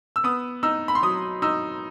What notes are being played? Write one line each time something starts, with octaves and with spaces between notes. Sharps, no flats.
E6
B3 D#6
D#4 E6
B5
C6
F#3 D#6
D#4 E6